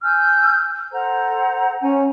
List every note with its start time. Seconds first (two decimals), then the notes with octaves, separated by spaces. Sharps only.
0.02 G#5 E6 F6 G6
0.91 A4 C5 F#5 A#5
1.81 C#4 F#5 G#5 A#5